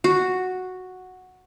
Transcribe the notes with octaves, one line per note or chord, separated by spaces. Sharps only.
F#4